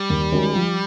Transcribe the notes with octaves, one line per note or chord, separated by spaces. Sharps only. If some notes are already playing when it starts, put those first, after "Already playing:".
Already playing: G3
D#2
D#3 G#3 C#4 F#4
F3